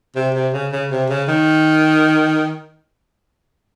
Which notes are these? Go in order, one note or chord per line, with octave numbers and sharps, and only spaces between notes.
C3
C3
C#3
C#3
C3
C#3
D#3